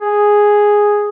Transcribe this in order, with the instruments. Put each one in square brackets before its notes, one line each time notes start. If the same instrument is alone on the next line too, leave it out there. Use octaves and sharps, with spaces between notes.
[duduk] G#4